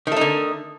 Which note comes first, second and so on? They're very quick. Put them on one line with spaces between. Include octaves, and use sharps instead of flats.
D#3 A3 D#4 D3